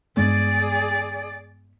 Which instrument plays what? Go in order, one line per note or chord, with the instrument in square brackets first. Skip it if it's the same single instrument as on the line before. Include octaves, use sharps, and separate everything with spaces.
[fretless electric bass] G2 G#3 B3 [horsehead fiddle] G#4 D5